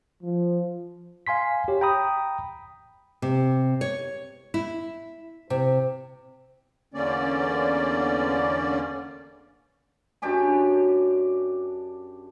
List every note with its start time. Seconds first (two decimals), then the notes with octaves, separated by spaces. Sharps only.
0.23 F3
1.27 F5 G#5 C6 B6
1.68 G4 C#5
1.81 G5 A#5 B5 D#6
3.22 C3
3.81 C#5
4.54 E4
5.50 C3
6.94 E2 D3 A#3 C#4 D5
10.22 F#2 D4 G4 G#5